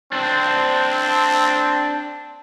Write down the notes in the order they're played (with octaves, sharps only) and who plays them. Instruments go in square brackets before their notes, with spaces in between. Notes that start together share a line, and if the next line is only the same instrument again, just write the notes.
[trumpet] C4 [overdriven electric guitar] D4 C5